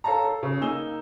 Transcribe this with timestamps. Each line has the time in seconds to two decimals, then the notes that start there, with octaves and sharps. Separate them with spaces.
0.04 A4 C#5 F5 A5 A#5
0.25 A4
0.43 C#3
0.61 A#3 D#4 G#5 E6 G7